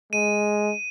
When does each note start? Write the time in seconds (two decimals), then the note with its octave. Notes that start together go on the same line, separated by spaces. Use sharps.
0.13 G#3 D#7